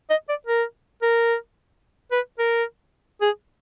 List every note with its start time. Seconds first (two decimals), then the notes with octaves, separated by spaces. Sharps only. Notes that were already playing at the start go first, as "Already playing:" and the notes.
0.10 D#5
0.29 D5
0.47 A#4
1.02 A#4
2.12 B4
2.39 A#4
3.22 G#4